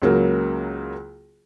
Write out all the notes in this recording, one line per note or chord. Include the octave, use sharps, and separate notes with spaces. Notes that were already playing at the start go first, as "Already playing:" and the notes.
C#2 C#3 F#3 A#3